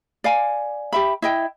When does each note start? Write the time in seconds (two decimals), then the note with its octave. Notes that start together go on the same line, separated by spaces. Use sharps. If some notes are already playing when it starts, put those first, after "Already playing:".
0.24 D5 F5 G#5
0.93 G4 E5 B5
1.22 E4 D#5 G5